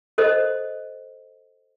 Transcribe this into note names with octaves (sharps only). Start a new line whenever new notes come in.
A4 C5 D#5